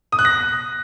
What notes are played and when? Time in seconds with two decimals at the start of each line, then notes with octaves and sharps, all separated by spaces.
0.12 D#6
0.19 F#6
0.25 A#6